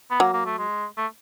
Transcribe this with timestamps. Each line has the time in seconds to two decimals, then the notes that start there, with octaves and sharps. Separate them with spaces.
0.11 B3
0.20 F#3 A#3
0.33 A#3
0.46 A3
0.58 G#3
0.97 A3